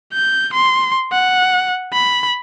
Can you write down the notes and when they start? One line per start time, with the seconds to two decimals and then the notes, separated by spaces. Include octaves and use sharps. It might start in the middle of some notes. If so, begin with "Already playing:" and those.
0.13 G6
0.54 C6
1.12 F#5
1.93 B5